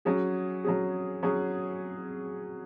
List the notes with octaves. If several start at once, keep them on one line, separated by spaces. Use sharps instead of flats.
F#3 C#4 G#4
F#3 C#4 G#4
F#3 C#4 G#4